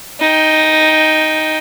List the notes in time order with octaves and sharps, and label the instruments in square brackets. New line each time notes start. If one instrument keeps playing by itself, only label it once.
[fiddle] D#4 G5